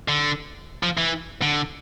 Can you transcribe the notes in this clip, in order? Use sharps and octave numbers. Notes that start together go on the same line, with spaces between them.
D3
F3
E3
D3